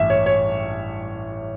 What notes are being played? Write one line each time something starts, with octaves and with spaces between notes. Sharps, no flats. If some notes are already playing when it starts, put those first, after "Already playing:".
Already playing: A1 G2 E5
C#5
C#5